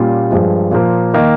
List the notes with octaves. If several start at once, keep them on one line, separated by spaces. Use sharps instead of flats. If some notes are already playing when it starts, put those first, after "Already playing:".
Already playing: A#2 G3 C#4 F4
G2 F3 G#3
A#2 F3 A#3
D#3 A#3